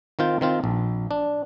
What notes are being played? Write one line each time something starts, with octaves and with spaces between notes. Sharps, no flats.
D#3 C4 F4 G5
D#3 C4 F4
A#1
D4